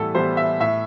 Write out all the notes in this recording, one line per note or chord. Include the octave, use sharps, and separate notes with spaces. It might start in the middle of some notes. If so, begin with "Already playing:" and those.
Already playing: A2 E3 G3 B3 A4
E3 G3 B3 C5
E5
A2 E5